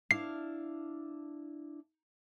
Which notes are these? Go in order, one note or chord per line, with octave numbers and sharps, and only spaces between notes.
D4 E4 F5 C7